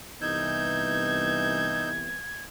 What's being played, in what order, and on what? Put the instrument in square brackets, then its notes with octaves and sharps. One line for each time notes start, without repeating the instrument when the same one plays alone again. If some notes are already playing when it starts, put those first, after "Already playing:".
[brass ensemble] C2 E3 B3 [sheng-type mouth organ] D#4 E6 G6 [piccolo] G#6